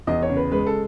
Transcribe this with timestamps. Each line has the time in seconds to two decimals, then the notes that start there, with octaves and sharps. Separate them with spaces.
0.07 E2 D#5
0.22 C#5
0.29 C#3
0.36 B4
0.51 G#3 B4
0.67 A4